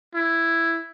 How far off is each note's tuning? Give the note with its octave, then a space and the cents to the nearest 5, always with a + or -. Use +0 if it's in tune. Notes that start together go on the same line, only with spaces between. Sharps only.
E4 +5